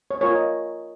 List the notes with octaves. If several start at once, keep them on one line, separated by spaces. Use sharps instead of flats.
C#5
F4 A#4 C#5
D#5